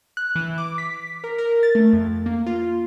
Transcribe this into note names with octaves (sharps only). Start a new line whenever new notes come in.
F#6
E3
D6
B6
A#4
A#4
A6
A3
F2
A#3
F4